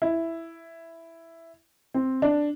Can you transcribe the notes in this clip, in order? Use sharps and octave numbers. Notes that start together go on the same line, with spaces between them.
E4
C4
D4